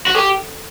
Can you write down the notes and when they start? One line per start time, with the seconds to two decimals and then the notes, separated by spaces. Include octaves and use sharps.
0.06 F#4
0.15 G4 A4